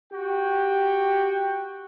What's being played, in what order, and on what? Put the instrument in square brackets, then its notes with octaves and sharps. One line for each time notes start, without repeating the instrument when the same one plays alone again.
[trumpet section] F#4 G5 [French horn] G4